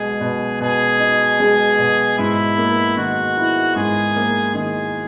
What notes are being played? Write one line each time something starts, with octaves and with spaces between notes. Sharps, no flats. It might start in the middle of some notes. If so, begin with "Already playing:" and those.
Already playing: B2 G#3 G#4
B2
B2 G#4
D#4
G#3
B2
G#2 E4
A#3
D#3 F#4
E4
G#2 G#4
A#3
D#3 G#4